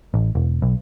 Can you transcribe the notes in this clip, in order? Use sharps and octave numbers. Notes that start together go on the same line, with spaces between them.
A1
E1
B1